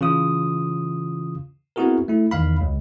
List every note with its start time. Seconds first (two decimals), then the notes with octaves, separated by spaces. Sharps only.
0.01 C#3 E3 F4 D#6
1.76 B3 C4 E4 F#4 G#4 A#4
2.08 A3 E4
2.31 E2 D#3 F5 B5
2.61 C#2